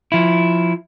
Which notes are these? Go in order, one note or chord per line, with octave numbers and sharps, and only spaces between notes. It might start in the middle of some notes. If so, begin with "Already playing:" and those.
F3 E4